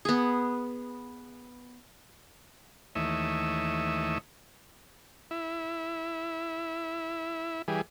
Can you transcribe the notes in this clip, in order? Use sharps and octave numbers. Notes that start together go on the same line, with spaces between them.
B3 G#4
D#2 E3 A3 C#5 D#5 E5
E4
E3 G3 G#4